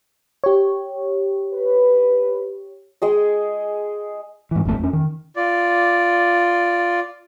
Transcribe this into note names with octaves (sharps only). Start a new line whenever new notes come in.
G4 C#5
B4
G#3 G#4 D#5
G#2 E3
G1 F2 A2 A3
F2 C#4
D#3
F4 D5